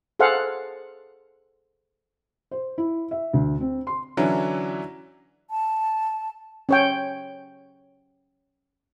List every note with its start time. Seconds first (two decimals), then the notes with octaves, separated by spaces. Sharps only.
0.19 G#4 A4 C5 F5 F#5
2.51 C5
2.78 E4
3.11 E5
3.34 D2
3.61 C4
3.87 C6
4.17 D3 E3 F#3 C#4 D4 E4
5.50 A5
6.69 C#4 C#5 G5